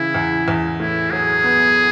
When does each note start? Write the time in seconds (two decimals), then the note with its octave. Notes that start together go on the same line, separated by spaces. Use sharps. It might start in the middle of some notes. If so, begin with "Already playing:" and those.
Already playing: C#3 E3 E4
0.14 E2
0.48 E2
0.79 A2 E4
1.11 F#3 G#4
1.44 B3